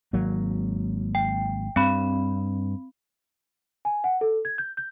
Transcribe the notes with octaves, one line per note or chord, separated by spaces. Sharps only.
G#1 F#3 A#3
G5
G2 C4 B5
G#5
F#5
A4
G#6
G6
G6